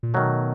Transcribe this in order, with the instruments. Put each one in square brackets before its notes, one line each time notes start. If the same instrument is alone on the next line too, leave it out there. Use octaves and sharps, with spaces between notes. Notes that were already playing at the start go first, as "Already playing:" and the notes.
[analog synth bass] A#2
[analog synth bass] B2 [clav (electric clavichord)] D#3 F#3 A3